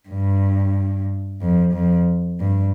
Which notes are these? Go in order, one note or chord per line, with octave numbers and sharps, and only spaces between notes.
G2
F2
F2
G2